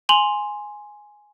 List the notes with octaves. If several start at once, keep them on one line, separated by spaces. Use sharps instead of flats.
G#5 C6 F7 F#7